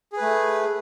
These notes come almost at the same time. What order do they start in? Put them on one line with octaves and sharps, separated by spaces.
G#4 B4 A3